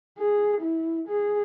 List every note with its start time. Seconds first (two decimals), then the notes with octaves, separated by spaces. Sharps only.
0.18 G#4
0.61 E4
1.08 G#4